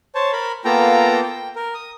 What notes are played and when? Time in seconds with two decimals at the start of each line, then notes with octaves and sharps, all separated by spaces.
0.15 C5 C#5 A5
0.33 A#4 B5
0.65 A#3 B3 F4 A4 G5 A#5
1.23 G5
1.56 A#4
1.74 D#6